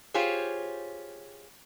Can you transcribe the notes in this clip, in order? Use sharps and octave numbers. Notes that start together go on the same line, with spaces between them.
F4 G4 G#4 C5 C#5